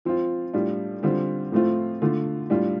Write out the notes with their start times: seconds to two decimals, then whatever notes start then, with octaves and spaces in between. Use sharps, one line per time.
0.05 F3 C4 F4
0.53 A2 G3 D4 F4
1.03 D3 G3 C4 F4
1.52 A2 F3 A3 C4 F4
2.02 D3 A3 F4
2.50 A2 G3 D4 F4